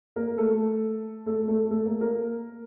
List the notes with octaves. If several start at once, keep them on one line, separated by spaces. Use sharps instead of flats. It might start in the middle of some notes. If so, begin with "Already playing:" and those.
A#3 A#4
A3 A4
A3 A4
A3 A4
A3 A4
A#3 A#4
A#3 A#4